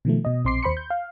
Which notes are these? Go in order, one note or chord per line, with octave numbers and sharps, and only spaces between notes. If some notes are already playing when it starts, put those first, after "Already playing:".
B2 D#3 F3 A3
B2 D#5
A#1 C4 C6 D6 C7
D#2 C5 B5 C6 C#7
G6
F5